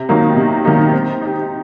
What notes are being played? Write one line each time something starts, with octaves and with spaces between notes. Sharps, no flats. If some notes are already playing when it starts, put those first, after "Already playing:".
Already playing: C3
D#3 F#3 A#3 D#4
C3
D#3 F#3 A#3 D#4
C4
D#4 G4